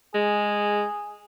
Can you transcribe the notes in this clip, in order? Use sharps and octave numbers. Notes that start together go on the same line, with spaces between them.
G#3 G#4